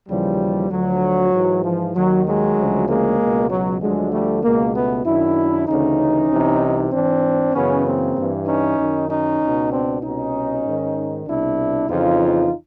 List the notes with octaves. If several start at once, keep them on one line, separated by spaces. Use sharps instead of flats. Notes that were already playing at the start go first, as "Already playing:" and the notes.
D#2 C#3 E3 F3 G3
D2 D3 F3 F#3
G#2 E3
F3
D#2 D#3 F#3
F#3 G#3
D2 C#3 F3
G#3 A#3
C#2 B2
F#3
D2 D3 F3 F#3 G#3
G3 A3
C#2 B2 G#3 A#3
A3 B3
F#2 D#3 D4 E4
D2 C#3 E3 C#4 D#4
C2 C3 E3
G#2 E3 C4 D4
F#2 C#3 E3 B3 C#4
A#3 C4
G2 E3
C#4 D#4
F#2 D#3
C#4 D#4
C#2 B2
C4 D4
C2 B2 C#4 D#4
G#2 D#3
C2 B2 D4 E4
F2 C#3 E3 D#4 F4